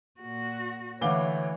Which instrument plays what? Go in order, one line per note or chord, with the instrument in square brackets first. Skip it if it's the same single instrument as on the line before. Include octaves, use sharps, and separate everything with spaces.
[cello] A#2 F#4
[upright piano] D2 D6 G7 [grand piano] E3 F5 F#5 [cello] C#5